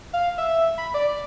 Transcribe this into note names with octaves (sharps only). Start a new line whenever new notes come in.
F5
E5
B5
D5